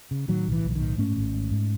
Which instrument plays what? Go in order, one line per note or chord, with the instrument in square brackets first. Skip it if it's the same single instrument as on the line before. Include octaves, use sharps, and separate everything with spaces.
[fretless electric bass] C#3
A2 D#3 F#3
B1
E3
B1
E3
D#3
A2
G#2 A3 C#4
G#1
G#2
G#2